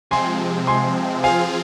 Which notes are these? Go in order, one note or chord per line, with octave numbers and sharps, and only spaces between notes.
C3 F3 G#3 C4 G#5 C6
G#5 C6
F3 C4 F4 G#4 F5 G#5